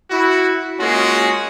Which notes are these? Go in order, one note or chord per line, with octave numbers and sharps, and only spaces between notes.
E4 F#4
G#3 A#3 C#4 F4 F#4